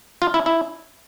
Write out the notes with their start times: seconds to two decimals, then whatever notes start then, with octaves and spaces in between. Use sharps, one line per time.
0.22 F4
0.34 E4
0.46 E4